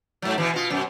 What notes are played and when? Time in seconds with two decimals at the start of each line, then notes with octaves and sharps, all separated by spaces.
0.22 G#2 F#3
0.38 B2 E3
0.54 B2 F4
0.70 F#2 B2